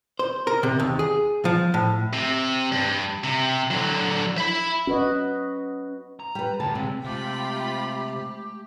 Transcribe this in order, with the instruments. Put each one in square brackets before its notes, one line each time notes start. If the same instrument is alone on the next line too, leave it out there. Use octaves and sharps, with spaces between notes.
[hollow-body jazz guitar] C5
A#4
C3
D#2
G#4
F3
A2
[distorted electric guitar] C3
G2
C3
D3 F#3
E5 B5
[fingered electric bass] C#4 [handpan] F#4 B4 D#5
[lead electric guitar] A#5
[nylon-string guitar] G3 B4
[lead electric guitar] D2 [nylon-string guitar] A5
[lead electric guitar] D2 G#3 [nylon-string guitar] C3
[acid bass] C3 [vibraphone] G#3 A3 E5 [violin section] F4 G5 B5 [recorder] G4